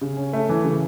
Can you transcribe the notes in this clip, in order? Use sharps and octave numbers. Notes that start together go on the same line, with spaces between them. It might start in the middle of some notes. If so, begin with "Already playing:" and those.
C#3
C#4
A3
E3
C#3